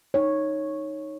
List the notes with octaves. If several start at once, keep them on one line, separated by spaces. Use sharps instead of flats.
D#4 C#5